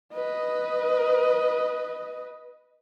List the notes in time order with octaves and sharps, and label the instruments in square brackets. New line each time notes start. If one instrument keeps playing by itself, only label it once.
[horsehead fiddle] B4 D#5